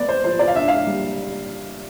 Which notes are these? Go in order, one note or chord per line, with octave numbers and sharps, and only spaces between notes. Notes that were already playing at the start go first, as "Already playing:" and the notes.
Already playing: A3 B3 D5
C5
F3 C5
D5
F5
D4 E5
F5
E5
G3